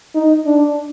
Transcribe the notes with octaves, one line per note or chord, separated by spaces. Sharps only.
D#4
D4